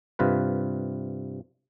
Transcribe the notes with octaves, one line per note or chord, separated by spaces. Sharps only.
G2 C3 F4 B4